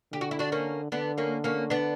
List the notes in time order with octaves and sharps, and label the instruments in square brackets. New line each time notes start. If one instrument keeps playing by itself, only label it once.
[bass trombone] D3 [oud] G4
[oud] F#4
E4
D4 F#4
A#3 C#4
[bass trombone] D3 [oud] B3 D4
[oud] A#3 C#4
A#3 C#4
B3 D4